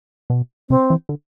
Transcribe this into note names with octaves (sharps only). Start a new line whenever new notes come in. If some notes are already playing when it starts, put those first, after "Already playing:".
B2
C3 C4
E3
D3